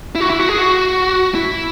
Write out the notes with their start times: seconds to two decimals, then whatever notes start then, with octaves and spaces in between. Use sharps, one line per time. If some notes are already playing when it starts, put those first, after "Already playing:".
0.15 E4
0.20 F#4
0.30 E4
0.39 F#4
0.49 G#4
0.58 F#4
1.35 E4